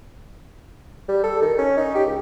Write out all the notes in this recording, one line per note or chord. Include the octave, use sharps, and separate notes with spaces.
G3
A4
D#3
C#4
D#4
G4
C#2